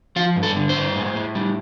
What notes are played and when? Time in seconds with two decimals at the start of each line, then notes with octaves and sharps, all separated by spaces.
0.16 F3 F4
0.36 G2
0.43 A4
0.56 D3
0.69 C5
0.76 G2
0.96 A2
1.15 A2
1.35 G3